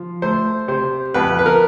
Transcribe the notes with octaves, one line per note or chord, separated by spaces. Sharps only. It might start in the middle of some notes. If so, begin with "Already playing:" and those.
Already playing: F3
A3 C5
C3 C5
F2 B4
B4
A#4